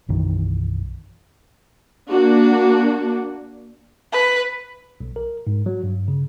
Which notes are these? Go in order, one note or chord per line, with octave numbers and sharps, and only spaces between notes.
B1 F#2 D#3 E3
A#3 D4 F#4
B4
B1
A#4
G#2
F#3
G2
C#3